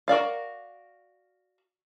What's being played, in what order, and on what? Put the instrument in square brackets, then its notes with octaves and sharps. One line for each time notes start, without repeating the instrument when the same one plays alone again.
[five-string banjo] F#4 A#4 D5 F5